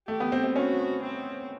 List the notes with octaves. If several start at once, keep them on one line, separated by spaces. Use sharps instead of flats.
A3 G4
B3
C4
C4
C#4 F#4
C4